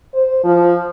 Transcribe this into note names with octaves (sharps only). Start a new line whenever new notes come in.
C5
F3